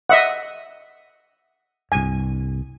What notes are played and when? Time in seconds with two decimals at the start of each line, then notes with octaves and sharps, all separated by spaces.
0.10 D#5 E5 F#5
1.92 C2 G2 G#5